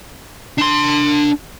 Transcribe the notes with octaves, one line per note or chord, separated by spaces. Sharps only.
D4 C6